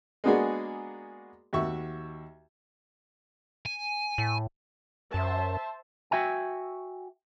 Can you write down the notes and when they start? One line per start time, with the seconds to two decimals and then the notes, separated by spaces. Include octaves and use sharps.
0.24 G#3 A#3 B3 D4 F#4 G#4
1.53 D#2 F#4 E5 C#6
3.66 G#5
4.18 A2
5.14 F#2 C5 E5 A5
6.11 F#4 E5 G5 G#5